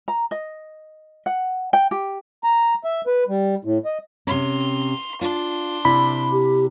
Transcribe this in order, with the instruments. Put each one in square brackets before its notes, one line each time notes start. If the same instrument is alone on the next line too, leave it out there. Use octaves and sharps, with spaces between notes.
[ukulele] A#5
D#5
F#5
G5
G4
[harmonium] A#5
E5
B4
G3
A2
D#5
[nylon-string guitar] C3 C#4 [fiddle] C6 F6
[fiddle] D4 C6 [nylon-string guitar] F4
[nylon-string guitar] C3 E4 D5 [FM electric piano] B5
[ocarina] G4